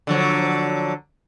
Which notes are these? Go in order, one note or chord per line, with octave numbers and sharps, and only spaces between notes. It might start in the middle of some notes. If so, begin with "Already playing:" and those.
D3 F3 F#3